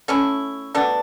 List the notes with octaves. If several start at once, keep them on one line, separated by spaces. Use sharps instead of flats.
A3 C#4 E4
B2 A3 D4